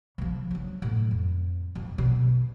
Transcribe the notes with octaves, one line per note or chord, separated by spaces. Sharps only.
C#3 F3
F#3 D4
A2
F2
F2 G#2
B2 D3